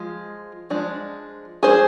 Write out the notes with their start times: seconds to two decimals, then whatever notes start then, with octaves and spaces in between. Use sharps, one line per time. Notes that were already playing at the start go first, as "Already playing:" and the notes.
Already playing: F3 G#3
0.70 F3 G#3 D4
1.63 F3 G#3 D4 G#4 C5